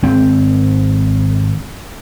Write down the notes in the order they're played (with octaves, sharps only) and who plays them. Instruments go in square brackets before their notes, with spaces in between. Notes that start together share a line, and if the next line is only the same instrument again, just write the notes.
[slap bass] G#1 C4